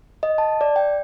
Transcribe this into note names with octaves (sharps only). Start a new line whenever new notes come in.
D#5
A5
D5
G5